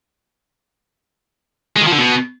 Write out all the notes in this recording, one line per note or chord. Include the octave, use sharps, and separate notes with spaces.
G#3
D#3
F3
D3
B2